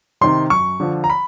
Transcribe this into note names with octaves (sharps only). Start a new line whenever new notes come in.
C3 D#3 C6
F#2 C#6
D3 F3
A#5
B5